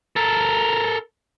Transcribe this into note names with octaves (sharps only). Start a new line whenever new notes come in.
A4 A#4